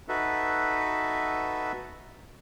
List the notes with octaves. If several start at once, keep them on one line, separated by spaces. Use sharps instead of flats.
D#4 F#4 A4 B4 E5